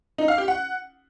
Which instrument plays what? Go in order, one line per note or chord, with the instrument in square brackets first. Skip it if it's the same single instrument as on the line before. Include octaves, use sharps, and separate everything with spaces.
[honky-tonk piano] D#4
F5
G4
F#5